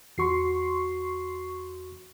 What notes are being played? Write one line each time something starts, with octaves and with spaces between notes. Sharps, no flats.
E2 F#4 C6 C#6 C7